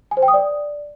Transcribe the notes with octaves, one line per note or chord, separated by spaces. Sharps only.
G#5
C5
G5
D#6
D5